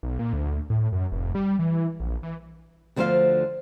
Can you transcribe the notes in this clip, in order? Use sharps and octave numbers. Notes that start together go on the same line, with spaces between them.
B1
A#2
D2
A2
F#2
F1
G3
E3
A#1
E3
D2 D3 F3 A#4 C5 F5